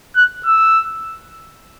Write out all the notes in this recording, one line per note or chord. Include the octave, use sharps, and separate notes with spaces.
F#6
E6